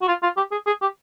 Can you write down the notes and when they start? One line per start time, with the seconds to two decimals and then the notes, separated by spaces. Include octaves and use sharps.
0.02 F#4
0.08 F4
0.23 F4
0.37 G4
0.52 G#4
0.67 G#4
0.82 G4